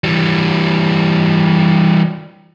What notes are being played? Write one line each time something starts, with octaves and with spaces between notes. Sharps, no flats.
E3 G3